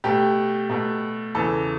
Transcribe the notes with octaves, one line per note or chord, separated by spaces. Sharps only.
B2 A3 G4
B2 A3
E2 C#3 E3 A4